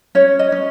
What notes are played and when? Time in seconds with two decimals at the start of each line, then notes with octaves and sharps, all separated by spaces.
0.15 C#4 C#5
0.39 D#5
0.52 C#4